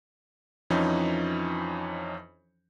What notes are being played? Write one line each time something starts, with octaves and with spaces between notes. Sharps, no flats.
F2 E3 F3 C#4 D#4